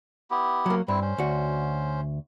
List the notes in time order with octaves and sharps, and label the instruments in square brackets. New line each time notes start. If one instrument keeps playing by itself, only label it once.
[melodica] B3 E4 G4
[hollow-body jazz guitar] F#3 A#3
[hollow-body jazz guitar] G2 [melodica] C4 E4
[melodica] C#4 C5
[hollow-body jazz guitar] D2 F#4